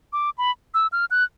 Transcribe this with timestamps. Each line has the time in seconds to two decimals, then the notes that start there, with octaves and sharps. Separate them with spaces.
0.13 D6
0.38 B5
0.74 E6
0.92 F6
1.11 F#6